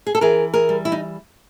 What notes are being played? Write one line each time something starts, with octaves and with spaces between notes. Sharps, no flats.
G#4
A4
E3 G#4 A#4
G#4 A#4
G3
E4
D#4